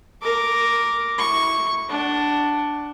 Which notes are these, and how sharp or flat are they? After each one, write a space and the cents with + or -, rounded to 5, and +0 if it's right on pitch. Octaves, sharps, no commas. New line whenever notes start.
A#4 +0 D6 -5
E4 -15 C#6 +0
D4 +0 F#5 +25